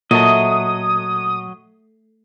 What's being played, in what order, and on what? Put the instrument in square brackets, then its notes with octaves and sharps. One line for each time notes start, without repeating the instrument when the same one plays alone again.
[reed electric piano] A#2 A5 [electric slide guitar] F#3 D#5 [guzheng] A3 [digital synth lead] D#6